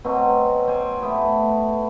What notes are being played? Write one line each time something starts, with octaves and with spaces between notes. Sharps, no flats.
B2 F#3 C4 F#4
C5 D5 G#5
A3 B3 G4